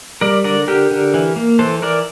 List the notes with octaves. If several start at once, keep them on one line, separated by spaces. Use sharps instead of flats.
G3 A#4 D5
D3 A#4 D5
D3 G4 A#4
D3
E3
A#3
E3 A4 C5
E3 A#4 D5